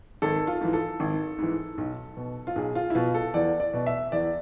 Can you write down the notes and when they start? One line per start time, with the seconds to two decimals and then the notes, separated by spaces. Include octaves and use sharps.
0.22 G#1 A4
0.47 F4
0.61 G#2 E3
0.73 A4
1.00 G#1
1.38 G#2 E3
1.78 B1
2.17 B2
2.47 F4
2.56 B1 G#4
2.75 F4
2.90 E4
2.95 B2 F4
3.14 A4
3.34 E2 D5
3.60 D5
3.73 B2
3.86 E5
4.12 E2 D5